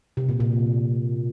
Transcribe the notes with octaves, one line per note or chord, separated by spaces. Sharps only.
C3
A#2
A#2